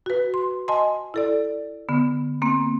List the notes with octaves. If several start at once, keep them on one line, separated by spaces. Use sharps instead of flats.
F#4 B4
C6
D#5 G#5 A5 C6
E4 A4 D5
D3 B3
A#3 C4